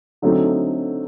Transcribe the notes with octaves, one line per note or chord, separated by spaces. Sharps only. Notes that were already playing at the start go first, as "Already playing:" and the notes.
D3 F#3 A3 C4 D#4